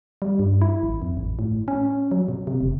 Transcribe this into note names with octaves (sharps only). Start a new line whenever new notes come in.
G3
G2
E4
A1
F2
A1
A2
C#4
F#3
B2
C3
F1